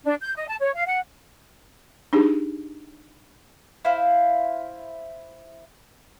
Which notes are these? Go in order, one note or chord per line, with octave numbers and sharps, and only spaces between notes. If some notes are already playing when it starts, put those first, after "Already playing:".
D4
G6
D#5
A5
C#5
F5
F#5
D4 D#4 G4 G#4
E4 C5 F5